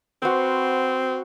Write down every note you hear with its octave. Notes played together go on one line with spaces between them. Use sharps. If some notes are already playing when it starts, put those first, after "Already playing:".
C4 F#4 B4 C5